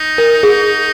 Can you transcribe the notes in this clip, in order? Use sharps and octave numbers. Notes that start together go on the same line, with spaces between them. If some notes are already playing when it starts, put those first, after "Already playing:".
Already playing: D#4
A#4
G#4